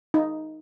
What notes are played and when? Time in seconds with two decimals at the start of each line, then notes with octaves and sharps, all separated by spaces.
0.14 D#4